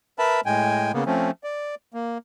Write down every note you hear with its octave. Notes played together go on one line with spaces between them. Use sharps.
A#4 B4 E5 A5 B5
A2 G#3 G5 G#5
C#3 A#3 B3
F3 A3 C4 C#4
D5
A#3